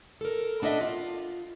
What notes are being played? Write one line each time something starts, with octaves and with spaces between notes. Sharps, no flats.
A4 A#4
B3 D4 A4 D#5 E5
F4